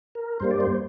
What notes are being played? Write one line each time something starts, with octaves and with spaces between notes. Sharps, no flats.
A#4
G2 G3 A#3 C5
D5
C5